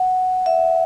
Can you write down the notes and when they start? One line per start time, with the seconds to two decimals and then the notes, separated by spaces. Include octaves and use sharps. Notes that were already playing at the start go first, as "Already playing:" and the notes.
Already playing: F#5
0.46 E5